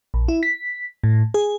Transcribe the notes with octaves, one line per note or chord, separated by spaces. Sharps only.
A#1
E4
B6
A2
G#4